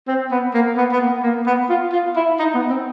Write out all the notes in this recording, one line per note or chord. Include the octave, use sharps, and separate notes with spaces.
C4
B3
A#3
B3
B3
A#3
A#3
B3
F4
F4
E4
D#4
B3
C4